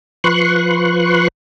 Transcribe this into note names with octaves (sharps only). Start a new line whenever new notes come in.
F3 B4 C6 C#6 F#6